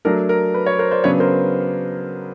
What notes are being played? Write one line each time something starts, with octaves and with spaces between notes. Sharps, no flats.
F#3 A3 D4 A#4
A#4
B4
B4 C#5
A#4 C5
C5 D5
C#3 F#3 B3 D4 B4 C#5
A#4 C5